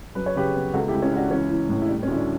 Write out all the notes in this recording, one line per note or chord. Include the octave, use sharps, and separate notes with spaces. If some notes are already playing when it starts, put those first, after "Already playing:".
F#2 B4
C#5
C#3 G4 B4
B3
C#2 F#4 A4
E4 G4
C#2
C#4 E4
C#2 D4 F#4
E3 C#4 E4
E3
A2
E4
G3 D4
C#4
D2 E4
D4